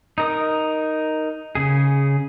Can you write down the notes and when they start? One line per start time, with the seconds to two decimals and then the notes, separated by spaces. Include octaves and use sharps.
0.18 D#4 A#4 D#6
1.55 C#3 G#4